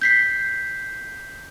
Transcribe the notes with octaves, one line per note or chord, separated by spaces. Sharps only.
G6 B6 C7